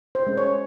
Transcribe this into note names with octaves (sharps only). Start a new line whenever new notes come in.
C5
G#3 C#4
C#5